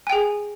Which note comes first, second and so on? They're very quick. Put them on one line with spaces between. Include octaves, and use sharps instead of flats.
G#5 G5 G#4